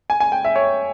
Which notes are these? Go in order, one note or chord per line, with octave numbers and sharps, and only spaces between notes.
G#5
G#5
G5
E5
C#5